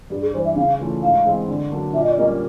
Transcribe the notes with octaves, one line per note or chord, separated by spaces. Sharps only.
G2 G4
G#4
E3 G3 C5
E5
C#3 F5
E3 A3 C#4 F4
G#2 F5
E3 G#3 C4
D3
F#3 A#3 D4
A#2 E5
D#5
D5
G3 A#3 C#4 D#5